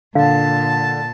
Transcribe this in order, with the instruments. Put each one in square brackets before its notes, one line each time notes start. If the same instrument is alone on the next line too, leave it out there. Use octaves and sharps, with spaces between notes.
[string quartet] A#2 A5 [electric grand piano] D3 [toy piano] F5